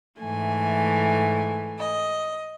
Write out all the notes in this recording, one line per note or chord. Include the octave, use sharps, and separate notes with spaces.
G#2 E3 A3 G#5
D#5